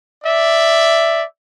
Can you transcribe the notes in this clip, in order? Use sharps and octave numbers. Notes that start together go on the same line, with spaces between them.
D5 E5